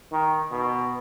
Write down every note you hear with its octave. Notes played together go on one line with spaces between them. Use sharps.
D#3
B2